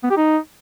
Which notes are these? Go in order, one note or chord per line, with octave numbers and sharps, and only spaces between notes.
B3
G4
D#4